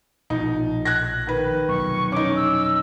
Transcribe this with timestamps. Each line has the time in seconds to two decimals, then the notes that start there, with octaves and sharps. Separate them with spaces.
0.30 A#1 B2 F3 D#4
0.85 F#6 G#6 A#6
1.27 D#3 B4
1.69 F1 B1 C#6
2.12 C#4 D#4 D6
2.36 E6